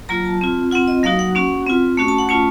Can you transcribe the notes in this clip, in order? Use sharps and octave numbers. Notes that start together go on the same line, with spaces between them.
F#3 A#3 F4 A#5
A5
C4 F4
C4 F4 F#5
D#5
F#3 A#3 D#4 F#4 F5
F#5
A#3 C#4 F#4
C4 F4
A3 C#4 F#4
A5
F#5
A3 C#4 F4 A5